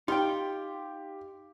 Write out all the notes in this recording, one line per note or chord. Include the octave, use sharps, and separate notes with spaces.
D#4 F4 G4 G5